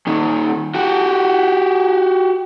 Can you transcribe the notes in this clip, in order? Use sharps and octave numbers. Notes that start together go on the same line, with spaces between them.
A#2 D#3
F#4 G4